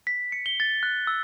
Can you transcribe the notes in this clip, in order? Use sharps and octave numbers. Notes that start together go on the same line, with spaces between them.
B6
C#7
G7
A6
F#6
E6